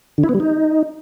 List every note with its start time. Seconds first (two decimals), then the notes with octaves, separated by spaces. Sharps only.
0.18 D3
0.23 E4
0.29 B3
0.34 G3
0.40 D#4